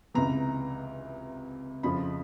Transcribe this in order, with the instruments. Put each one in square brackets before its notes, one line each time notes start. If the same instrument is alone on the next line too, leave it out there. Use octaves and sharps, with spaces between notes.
[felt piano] C#2 C3 E3 A#5
F2 C#3 F3 B5